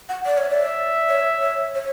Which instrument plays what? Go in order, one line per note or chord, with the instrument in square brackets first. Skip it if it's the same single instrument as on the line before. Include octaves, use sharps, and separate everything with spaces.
[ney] F#5
D5
[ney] C#5 [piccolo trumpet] E5
[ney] D5
C#5
C#5
C#5